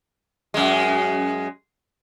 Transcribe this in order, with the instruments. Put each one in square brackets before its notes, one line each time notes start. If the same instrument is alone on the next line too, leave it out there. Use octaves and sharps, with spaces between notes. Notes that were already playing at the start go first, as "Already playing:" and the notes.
[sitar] F#2 G#3